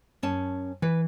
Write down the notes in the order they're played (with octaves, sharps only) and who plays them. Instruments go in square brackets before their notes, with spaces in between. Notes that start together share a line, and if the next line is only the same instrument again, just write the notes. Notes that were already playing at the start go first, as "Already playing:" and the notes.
[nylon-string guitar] F#2 C#4 A5
[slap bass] E3 [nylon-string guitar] B4